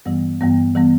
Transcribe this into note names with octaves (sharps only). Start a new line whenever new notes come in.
G2 E3 G3 B3
G2 E3 G3 B3
E3 G3 B3